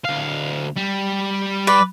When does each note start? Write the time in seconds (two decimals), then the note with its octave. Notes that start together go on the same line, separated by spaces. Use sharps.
0.05 D2 F5
0.76 G3
1.67 B4 D5